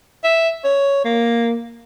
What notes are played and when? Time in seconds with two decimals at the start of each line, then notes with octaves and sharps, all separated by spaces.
0.24 E5
0.65 C#5
1.04 A#3